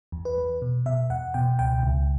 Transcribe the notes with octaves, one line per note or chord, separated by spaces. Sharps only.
E2
B4
E2
B2
B2 E5
E2 F#5
B2 G5
C#2 G5
C#2